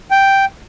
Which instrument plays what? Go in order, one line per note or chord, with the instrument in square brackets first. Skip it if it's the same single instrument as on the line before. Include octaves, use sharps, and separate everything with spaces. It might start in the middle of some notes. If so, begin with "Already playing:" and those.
[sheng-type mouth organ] G5